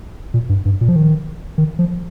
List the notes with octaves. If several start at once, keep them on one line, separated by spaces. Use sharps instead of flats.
A#2
G2
G2
A#2
F3
D#3
D#3
F3